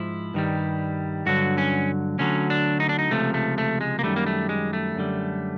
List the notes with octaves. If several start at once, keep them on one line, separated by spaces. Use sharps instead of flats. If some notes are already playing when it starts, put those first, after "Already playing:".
Already playing: G#2 F3 E4
G2 D#3 G3
G2 D3 F#3 F#4
C#4
D2 D3 F#3 C#4
D4
D#4
D4
D#4
C#2 C3 F3 A3
A3
A3
G#3
A#3
F#2 D#3 G3 A3
A#3
A3
G#3
A3
F#2 D3 G3